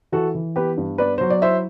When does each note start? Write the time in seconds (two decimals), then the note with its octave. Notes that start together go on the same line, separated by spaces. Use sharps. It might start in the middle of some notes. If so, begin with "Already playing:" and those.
0.12 E3 F#4 A4
0.35 E3
0.56 B3 G4 B4
0.78 G2
0.98 B3 B4 D5
1.18 F#3 C5
1.30 D5
1.42 E4 C5 E5